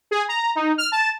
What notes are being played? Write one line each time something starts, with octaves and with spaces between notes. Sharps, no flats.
G#4
A#5
D#4
F6
A5